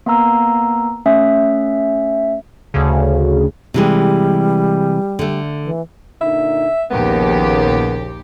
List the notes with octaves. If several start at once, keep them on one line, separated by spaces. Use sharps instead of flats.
A#3 B3 F5 A#5 E6
A3 C#4 E5
D2 C#3
C3 E3 G3 G#3
D3 A3
E3
A#2 D3 D#4 E5
A#1 D#2 C#3 B3 G4 A#4